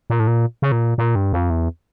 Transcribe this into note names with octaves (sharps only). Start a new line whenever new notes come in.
A#2
A2
A#2
C#3
A#2
A#2
G2
F2
E2